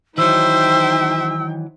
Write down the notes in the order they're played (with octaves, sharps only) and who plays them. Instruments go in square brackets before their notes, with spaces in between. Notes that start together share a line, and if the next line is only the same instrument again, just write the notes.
[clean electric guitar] D#3 E3 F#3 [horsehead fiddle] D#4 G5 [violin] C5 E5 [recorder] E6